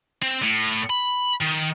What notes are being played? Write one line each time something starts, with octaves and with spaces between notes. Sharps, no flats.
C4
A2
B5
D#3